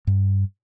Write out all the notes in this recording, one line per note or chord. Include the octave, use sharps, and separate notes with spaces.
G2